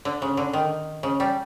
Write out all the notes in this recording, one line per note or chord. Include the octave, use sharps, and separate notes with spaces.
D3
C#3
D3
D#3
C#3
G3